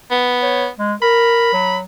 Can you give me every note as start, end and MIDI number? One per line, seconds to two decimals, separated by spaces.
0.11 0.69 59
0.42 0.67 73
0.79 0.94 56
1.02 1.49 70
1.02 1.77 83
1.53 1.82 54